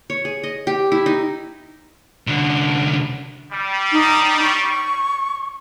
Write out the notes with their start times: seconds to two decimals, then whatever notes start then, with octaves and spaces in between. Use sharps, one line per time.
0.10 C#5
0.25 G#4
0.43 D#5
0.67 G4
0.92 E4
1.06 D#4
2.27 C2 D3
3.52 G3
3.92 D#4
4.42 C#6